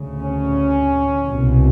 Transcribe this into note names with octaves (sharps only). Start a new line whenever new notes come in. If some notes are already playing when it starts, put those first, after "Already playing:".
Already playing: D2 C#3
C#4
C2 B2